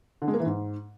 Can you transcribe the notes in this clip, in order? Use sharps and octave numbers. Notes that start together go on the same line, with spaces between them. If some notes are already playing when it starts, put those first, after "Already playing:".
D3
G#3
A#3
E3
G#2